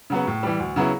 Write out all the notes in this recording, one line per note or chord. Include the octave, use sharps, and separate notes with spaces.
C#3 F#3 B3
A2
E3 G3
D2
C#3 F#3 B3 E4